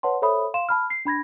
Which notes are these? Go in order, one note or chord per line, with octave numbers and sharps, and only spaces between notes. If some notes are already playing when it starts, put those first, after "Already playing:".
B4 C#5 F#5 A5 C6
A4 C5 C#5 E5 B5 D#6
F5 C6 E7
A5 B5 F6
C7
D4 B5 G#6 A#6